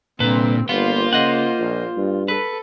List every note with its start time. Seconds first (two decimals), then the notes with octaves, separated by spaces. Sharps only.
0.20 C2 A#2 D3 C4 B4
0.69 G1 A#3 B3 F4 C5
1.13 C#3 D#5 F#5
1.60 A#1
1.97 G2
2.28 A4 B4